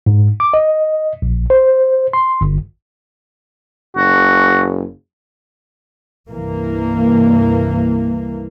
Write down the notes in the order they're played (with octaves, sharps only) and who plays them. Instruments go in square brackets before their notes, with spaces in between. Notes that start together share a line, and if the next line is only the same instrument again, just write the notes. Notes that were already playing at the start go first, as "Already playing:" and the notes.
[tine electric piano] G#2
D6
D#5
A#1
C5
C6
G1
[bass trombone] F#1 [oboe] F#4
[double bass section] C2 G2 E3 A#3